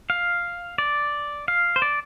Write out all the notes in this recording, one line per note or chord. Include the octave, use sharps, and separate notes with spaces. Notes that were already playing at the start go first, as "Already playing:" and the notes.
F5
D5
F5
C5
D5